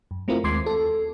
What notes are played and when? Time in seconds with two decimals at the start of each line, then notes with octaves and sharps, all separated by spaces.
0.11 F#2
0.28 A3 C4 E4 F4 A#4
0.44 D#2 G#3 C6 D6 G#6 C7
0.66 A4